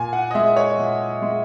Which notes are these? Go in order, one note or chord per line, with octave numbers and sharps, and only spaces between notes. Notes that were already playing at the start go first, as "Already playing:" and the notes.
Already playing: A#2 G#5
F#5
D#5
G#3 E5
C#5
A#2
G#3